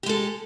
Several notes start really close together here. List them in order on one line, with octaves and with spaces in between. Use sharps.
G4 G#3 A4